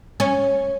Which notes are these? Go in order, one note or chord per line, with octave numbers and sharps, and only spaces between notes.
C#4